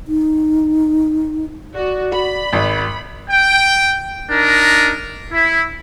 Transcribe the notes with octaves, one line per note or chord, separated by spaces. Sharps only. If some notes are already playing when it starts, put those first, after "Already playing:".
D#4
F#4 D5
F#4 B5
G#1
G5
D4 D#4 A#4
E4